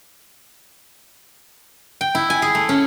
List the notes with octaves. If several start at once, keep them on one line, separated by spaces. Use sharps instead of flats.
G5
E4
G#5
G#4
A3
C#4